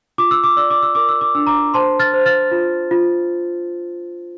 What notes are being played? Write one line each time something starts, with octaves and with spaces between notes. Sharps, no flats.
F4 D6
E6
D6
D5 E6
D6
E6
A#4 D6
E6
D6
D4 E6
A#5 D6
C5 A5 C6
F6 A6
C5
F6 A6
F4
F4